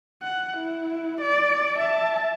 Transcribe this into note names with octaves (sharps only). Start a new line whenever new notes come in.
F#5
E4
D5
E5 A5